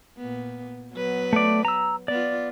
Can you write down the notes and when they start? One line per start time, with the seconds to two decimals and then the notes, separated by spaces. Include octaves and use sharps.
0.17 A#2 B3
0.94 F#3 B3 B4
1.33 A3 D5
1.65 A#5 E6
2.08 B3 F4 D5